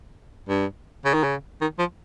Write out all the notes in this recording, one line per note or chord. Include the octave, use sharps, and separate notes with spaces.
G2
C#3
D#3
C#3
D#3
F3